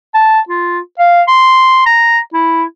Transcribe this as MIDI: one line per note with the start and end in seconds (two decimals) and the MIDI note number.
0.14 0.40 81
0.49 0.79 65
0.99 1.22 77
1.28 1.85 84
1.86 2.19 82
2.34 2.64 64